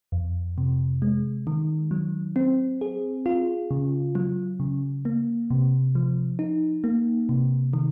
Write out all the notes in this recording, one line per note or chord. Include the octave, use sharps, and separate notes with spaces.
F2
C3
G#3
D#3
F#3
C4
G#4
F4
C#3
F#3
C#3
A#3
C3
F3
D#4
A#3
C3
D#3